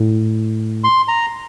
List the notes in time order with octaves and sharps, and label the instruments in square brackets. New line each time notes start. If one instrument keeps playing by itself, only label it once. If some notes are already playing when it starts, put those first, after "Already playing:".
Already playing: [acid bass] A2
[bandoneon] C6
A#5